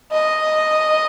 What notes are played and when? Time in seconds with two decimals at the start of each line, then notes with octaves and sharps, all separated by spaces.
0.12 D#5